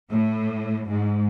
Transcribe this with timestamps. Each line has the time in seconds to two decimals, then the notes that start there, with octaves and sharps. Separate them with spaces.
0.11 A2
0.90 G#2